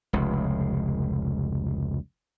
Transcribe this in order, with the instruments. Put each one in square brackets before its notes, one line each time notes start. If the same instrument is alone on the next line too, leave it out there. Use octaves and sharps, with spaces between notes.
[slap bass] F1 C#2